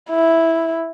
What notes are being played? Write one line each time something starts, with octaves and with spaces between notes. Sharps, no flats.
E4